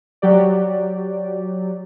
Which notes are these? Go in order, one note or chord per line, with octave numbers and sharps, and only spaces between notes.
F#3 G4 D5